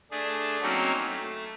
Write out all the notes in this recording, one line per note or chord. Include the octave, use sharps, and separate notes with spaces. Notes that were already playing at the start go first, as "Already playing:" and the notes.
A3 D4 G#4
F#3 A#3 C4 C#4 D#4 F#4
A3